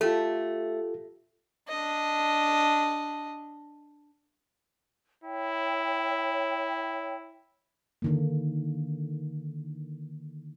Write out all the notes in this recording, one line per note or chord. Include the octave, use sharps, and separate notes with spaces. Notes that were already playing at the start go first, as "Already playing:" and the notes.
A3 F4 G4 A4
D4 D#5
E4 C#5 G5
D3 D#3 A#3